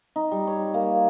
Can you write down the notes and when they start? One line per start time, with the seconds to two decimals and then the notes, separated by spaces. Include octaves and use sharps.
0.16 D#4
0.31 G3
0.47 C#5
0.74 A#3